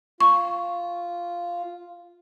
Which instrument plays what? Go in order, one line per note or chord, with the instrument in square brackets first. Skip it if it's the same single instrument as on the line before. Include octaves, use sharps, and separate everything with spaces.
[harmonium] F4 [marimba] C#6